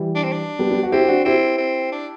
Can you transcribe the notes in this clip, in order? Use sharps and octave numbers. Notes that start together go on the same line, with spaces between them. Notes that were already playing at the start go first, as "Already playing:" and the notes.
Already playing: E3 G3
D4
C4
D4
G3 B3
G3 B3
F#4
C4 E4 G4
G4
D4 F#4
C4 E4 G4
C4
D4